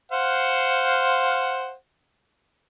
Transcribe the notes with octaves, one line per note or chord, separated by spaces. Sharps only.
C5 F5 F#5